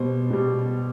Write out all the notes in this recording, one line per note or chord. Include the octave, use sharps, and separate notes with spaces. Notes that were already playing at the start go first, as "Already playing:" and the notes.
Already playing: B2 G3 C5
B2 G3